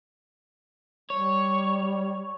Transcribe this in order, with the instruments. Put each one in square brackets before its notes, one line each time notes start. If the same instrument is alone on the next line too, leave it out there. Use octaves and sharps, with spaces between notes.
[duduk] G3 [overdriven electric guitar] C#5